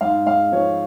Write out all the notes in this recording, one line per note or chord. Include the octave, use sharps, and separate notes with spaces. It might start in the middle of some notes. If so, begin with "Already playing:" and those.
G#2 F5
G#3 F5
F3 C#5